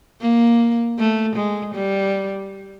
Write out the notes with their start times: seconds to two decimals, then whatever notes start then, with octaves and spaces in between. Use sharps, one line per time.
0.21 A#3
0.98 A3
1.36 G#3
1.74 G3